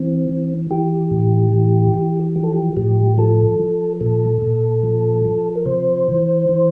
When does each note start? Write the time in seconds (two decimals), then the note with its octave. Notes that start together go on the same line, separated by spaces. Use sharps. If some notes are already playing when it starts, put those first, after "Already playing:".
Already playing: E3 C4
0.29 E3
0.71 E3 G4
1.11 A2
1.53 E3
1.94 E3
2.36 F3 G4
2.44 A4
2.53 G4
2.77 A2 G4
3.18 F3 A4
3.59 F3
4.01 A#2 A4
4.42 A#2
4.83 F3
5.25 F3
5.55 A#4
5.66 C3 C5
6.07 E3
6.49 E3